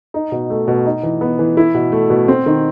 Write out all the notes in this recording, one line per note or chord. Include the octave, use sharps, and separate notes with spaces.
D#4
B2
A3
B2
D#4
E3
B3
E3
E4
B2
A3
B2
C4
D#3